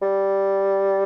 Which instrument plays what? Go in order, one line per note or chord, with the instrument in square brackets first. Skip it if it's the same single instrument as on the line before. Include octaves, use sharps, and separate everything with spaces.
[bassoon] G3